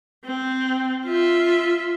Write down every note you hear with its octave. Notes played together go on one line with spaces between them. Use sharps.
C4
F4 E5